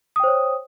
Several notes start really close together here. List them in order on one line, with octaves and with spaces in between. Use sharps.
D#6 G5 C5 C#5